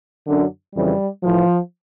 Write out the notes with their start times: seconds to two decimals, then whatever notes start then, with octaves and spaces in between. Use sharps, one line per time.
0.27 F#2 D3
0.75 F2 C#3 E3 G3
1.24 A2 E3 F3